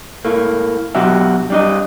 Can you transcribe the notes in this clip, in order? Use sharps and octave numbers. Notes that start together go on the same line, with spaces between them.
A2 A3 A#3
B2 F#3 D4 F#4 G4 E5
G3 D4 D#5